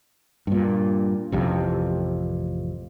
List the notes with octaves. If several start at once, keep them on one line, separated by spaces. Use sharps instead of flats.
G2 A#2
A1 F2 C3